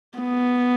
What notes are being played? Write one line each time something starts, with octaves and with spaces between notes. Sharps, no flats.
B3